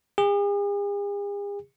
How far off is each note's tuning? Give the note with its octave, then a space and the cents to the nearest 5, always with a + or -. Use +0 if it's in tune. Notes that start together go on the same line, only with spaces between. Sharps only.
G#4 -45